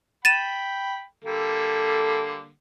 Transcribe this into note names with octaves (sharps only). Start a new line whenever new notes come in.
G5 B5 A6 D#7 E7
D3 G3 A#3 A4